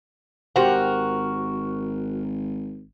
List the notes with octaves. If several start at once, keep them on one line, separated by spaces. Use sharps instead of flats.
G#1 F#4 G4 A#4 C5 F#5